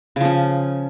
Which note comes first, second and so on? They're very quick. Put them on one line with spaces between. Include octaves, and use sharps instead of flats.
C#3 F3 C#4